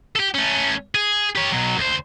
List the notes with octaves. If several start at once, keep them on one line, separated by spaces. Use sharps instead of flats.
G4 A4
A3 C#4
G#4
G4 C#5
B2 F#3
D2 C5